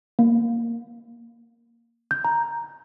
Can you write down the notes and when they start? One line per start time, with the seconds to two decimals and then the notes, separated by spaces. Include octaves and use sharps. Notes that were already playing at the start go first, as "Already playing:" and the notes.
0.19 A#3
2.11 G6
2.25 A#5